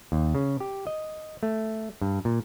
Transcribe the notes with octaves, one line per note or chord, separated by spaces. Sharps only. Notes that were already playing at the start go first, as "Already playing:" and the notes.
D#2
C#3
G4
D#5
A3
G2
A#2